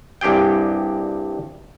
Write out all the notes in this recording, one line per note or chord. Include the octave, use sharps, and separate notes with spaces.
C2 G2 G4 G#4 G5